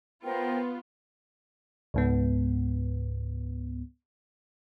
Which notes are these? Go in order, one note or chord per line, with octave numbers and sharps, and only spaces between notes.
B3 F4 A#4 C5 G5
C#2 G#2 B3